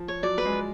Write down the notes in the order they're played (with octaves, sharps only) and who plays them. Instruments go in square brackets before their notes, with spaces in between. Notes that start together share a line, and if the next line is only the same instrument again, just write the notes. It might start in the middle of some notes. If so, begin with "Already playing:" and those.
Already playing: [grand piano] F3
[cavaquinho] C#5
[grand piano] F#3 [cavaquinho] D5
[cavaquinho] B4
[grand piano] G#3
[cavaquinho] D5